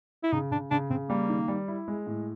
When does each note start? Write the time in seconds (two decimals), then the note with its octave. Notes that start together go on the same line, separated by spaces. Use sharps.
0.24 E4
0.32 C#3 D#4
0.52 C#3 D4
0.71 C#3 D4
0.90 C#3 C4
1.09 G3 A#3
1.29 D#3
1.48 G3
1.68 E4
1.88 G#3
2.07 A2